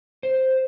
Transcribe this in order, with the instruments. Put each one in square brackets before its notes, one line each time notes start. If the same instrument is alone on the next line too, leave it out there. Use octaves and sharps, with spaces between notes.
[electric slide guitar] C5